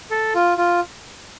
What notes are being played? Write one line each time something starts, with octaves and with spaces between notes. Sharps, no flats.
A4
F4
F4